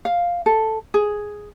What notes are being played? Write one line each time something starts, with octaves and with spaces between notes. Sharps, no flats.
F5
A4
G#4